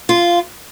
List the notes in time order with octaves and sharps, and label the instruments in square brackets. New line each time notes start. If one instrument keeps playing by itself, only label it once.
[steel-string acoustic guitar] F4